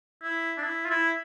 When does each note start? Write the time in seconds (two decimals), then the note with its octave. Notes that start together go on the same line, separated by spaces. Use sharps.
0.23 E4
0.58 D4
0.64 E4
0.85 F4
0.90 E4